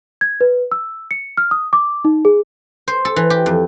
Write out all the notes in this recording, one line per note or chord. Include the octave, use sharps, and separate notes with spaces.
G#6
B4
E6
C#7
F6
D#6
D6
D#4
G#4
C5
A4
E3
G4
F2